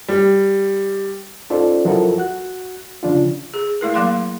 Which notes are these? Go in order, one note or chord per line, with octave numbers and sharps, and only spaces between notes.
G3
C#4 D#4 F4 A4 C5 D5
F3 F#3 E4 F4 A4 A#4
F#4 F#6
C#3 F3 D4 F4
G#4
A3 E4 A#4
F#3 A#3 F5 C6